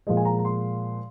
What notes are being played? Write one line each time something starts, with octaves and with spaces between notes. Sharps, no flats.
A#2 F3 G#3 D#5
G#5
A#5
A#5
C6